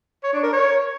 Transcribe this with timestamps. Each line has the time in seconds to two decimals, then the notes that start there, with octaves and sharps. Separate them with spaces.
0.23 C#5
0.33 D4
0.43 A#4
0.53 C#5